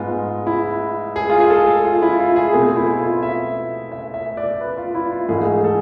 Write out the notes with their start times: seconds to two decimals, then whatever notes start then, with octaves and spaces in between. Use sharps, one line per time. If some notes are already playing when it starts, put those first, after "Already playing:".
Already playing: G#2 G#3 B3 F4
0.47 E4
1.16 G#4
1.30 F4
1.40 G#4
1.50 A4
1.85 F4
2.02 E4
2.20 F4
2.36 G#4
2.53 B2 A3 C4 G#4
2.76 E4
2.99 F4
3.23 E5
3.92 E5
4.14 E5
4.37 D5
4.61 B4
4.77 F4
4.95 E4
5.12 F4
5.29 G#2 E3 A3 G#4
5.64 A4